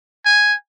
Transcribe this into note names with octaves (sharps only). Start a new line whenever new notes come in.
G#5